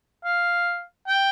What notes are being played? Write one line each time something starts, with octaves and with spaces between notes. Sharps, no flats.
F5
G5